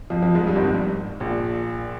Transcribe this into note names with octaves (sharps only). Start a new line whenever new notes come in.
F2 F3
F2 F3
G#2 G#3
G2 G3
G#1 G#2
F2
G2
A#1 A#2